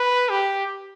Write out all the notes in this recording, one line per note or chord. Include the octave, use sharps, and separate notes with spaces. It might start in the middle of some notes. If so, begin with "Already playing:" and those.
Already playing: B4
G4